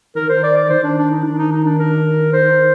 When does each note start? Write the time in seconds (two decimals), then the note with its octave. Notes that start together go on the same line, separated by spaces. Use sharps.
0.16 D#3 A#4
0.29 C5
0.43 D5
0.57 D5
0.70 D#3 C5
0.83 D4
0.98 D4
1.11 D#4
1.24 D#3 D4
1.38 D#4
1.52 D#4
1.65 D4
1.79 A#4
2.33 C5